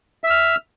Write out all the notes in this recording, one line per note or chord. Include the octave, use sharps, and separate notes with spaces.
E5 E6 F6